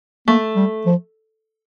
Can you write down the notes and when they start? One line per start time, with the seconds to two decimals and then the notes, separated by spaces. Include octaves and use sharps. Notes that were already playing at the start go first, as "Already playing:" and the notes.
0.28 A3 A#3
0.56 G3
0.86 F3